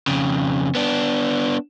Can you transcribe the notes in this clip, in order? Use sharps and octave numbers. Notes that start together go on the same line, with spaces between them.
F2 C#3
B3 D4